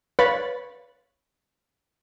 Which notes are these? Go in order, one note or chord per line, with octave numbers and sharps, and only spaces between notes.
B4 C#5 F5 B5 A6